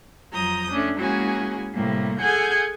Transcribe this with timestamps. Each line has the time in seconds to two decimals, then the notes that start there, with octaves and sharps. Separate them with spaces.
0.33 F2 F3 F#3 A#5 D#6 G6
0.70 A3 C#4 D4
0.99 G#3 A#3 C#4 E4 F#4 G#4
1.73 A2 C3 G3 A3 A#3
2.20 G#4 A4 F#5 G#5 G6 G#6